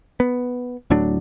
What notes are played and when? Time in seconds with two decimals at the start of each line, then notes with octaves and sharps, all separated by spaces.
0.20 B3
0.90 D1 A2 F#3 D4